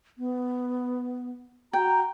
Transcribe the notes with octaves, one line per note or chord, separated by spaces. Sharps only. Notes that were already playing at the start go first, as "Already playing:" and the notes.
B3
F#4 G5 A#5